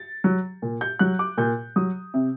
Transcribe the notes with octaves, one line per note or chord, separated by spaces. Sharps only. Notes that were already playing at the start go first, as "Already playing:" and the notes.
Already playing: A6
F#3
A#2
G6
F#3 F#6
D6
A#2 G6
F#3 D#6
C3